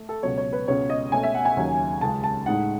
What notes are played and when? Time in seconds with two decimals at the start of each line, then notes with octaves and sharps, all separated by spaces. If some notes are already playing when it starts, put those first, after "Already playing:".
Already playing: A3
0.09 A4
0.23 C#2 B2 F#3 C#5
0.37 C#5
0.53 B4
0.68 C#2 B2 G#3 C#4 C#5
0.90 D#5
1.12 B2 A3 C#4 G#5
1.23 E5
1.35 F#5
1.45 G#5
1.57 D#2 C#3 F#3
2.01 C#2 C#3 G#3 A5
2.24 A5
2.46 A2 G#3 D#4 F#5